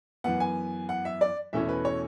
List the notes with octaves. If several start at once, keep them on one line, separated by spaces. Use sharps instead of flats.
F#2 E3 B3 F#5
G#5
F#5
E5
D5
E2 B2 A3 C#4 E4 E5
B4
C#5